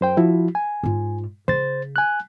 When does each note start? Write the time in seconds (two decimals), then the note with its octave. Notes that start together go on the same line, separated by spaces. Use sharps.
0.01 F#2 C5 G5
0.17 F3 E4 F#4
0.55 G#5
0.83 G#2 F4
1.48 C#3 C5 A6
1.96 G#5 F#6